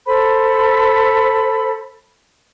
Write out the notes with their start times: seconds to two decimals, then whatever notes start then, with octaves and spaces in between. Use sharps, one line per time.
0.06 A4 C5 B5